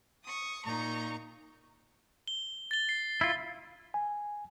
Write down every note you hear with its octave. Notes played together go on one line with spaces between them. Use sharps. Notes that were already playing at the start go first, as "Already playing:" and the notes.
C#6 D#6
A#2 D#4 A#5 C#6
G7
A6 G7
C7
E4 F4
G#5